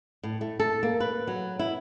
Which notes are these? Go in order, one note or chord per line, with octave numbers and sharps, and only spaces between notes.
A2
A3
A4
A#3
B4
F#3
E4